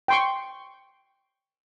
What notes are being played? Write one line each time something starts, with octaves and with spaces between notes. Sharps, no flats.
G5 C6 C#6